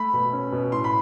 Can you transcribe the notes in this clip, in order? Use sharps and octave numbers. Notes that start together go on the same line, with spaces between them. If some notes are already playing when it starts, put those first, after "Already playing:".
Already playing: A3 B5
B2
C#4
B2
A2 C6
B5